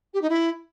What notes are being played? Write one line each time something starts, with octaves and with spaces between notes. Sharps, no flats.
G4
D#4
E4